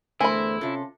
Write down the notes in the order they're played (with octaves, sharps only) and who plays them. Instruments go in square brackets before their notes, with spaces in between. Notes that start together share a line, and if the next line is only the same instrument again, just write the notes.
[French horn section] E2 D3 A3 [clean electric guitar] E4 [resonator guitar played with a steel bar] A#4 C5 [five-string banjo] G#5 B5
[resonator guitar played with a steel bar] C3 A4 [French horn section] C#4 F4